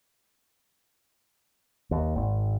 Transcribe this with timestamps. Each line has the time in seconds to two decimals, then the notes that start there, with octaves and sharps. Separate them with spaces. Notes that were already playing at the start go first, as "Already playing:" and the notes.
1.91 D#2
2.16 G#1